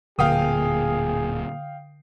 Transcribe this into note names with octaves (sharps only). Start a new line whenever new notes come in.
D1 A#2 D3 G#4 F5 G5 D#6